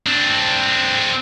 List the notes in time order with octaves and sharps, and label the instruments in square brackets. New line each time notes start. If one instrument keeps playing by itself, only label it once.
[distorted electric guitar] C4 D4